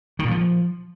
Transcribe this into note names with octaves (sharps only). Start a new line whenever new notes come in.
D#3
A#2
F3